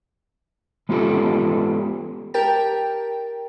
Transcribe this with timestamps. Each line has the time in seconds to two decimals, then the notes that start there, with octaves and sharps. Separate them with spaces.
0.89 G#3 B3 C#4 F4 G4 A4
2.34 G4 A#4 G5 A5